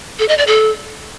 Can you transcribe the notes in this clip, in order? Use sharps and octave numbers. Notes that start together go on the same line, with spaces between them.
A4
D#5
D5
A4